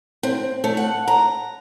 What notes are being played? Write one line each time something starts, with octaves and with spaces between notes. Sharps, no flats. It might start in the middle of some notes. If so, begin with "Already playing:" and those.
C4
A3
F#5
A#5